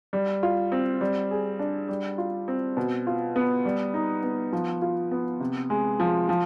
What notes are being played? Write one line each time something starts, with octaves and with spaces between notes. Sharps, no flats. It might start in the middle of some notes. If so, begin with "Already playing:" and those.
G3
F4
C4
G3
G#4
D4
G3
F4
C4
B2
F4
B3
G3
D#4
B3
F3
F4
B3
C3
G#3
F3
F3